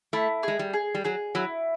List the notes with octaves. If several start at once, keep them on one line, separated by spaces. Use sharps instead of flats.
A3 E4
G#3 G#4
G3
G#4
G3
F#3 G#4
F#3 E4